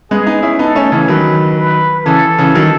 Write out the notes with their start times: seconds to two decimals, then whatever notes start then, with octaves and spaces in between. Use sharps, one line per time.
0.11 G#3 B3 G#4
0.26 B3 D#4
0.43 C#4 E4
0.59 B3 D#4 A4
0.75 A3 C#4
0.92 C#3 E3
1.08 D#3 F#3 B4
1.57 B4
2.05 C#3 E3 A4
2.38 C#3 E3
2.55 D#3 F#3